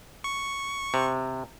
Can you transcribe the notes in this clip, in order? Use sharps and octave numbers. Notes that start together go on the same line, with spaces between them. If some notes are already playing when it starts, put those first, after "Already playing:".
C#6
C3